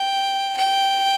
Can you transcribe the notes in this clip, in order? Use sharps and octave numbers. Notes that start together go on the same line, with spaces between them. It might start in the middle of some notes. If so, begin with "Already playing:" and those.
Already playing: G5
G5